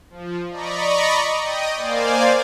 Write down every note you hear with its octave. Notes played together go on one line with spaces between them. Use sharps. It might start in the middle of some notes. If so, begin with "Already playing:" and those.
F3
D5 D#5 A#5 B5 C#6
D#5 G5 D#6
A#3 C5 D5 F5 G#5